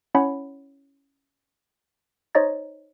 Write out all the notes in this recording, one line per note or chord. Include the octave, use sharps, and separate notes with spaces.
C#4 E4 C#5 F#5 B5
D#4 C5 C#5 D#5 A#5 A6